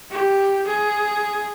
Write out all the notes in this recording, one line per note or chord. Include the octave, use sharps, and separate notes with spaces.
G4
G#4